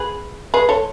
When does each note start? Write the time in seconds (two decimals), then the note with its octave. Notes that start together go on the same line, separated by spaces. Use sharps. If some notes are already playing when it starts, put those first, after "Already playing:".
Already playing: G#4 B4
0.54 G#4 B4
0.69 A4 C#5